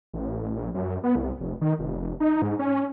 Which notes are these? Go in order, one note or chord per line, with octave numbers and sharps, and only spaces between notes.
A1
A#1
F#2
B3
C2
F1
D#3
F1
D#4
G#2
C#4